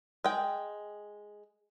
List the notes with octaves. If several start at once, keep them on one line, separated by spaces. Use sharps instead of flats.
G#3 G5